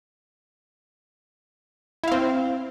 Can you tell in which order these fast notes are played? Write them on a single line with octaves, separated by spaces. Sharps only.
E4 F5 C4